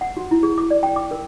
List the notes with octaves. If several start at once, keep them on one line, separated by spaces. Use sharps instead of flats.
F#5
F#4
E4
G#4
D6
D5
G5
D6
A#4